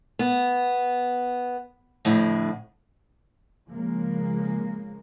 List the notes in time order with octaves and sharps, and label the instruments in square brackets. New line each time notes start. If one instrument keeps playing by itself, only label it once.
[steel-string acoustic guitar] B3
F2 A2 D3
[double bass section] C#3 F3 G#3 A#3